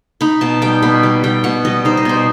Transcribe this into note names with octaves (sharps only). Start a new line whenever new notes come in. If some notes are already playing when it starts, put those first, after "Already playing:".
D#4 B5
B2 A5
G3 G5
B2 B5
G3
G3 G5
B2 F#5
G3 D#5
D#4 C5
D#5
B2 C5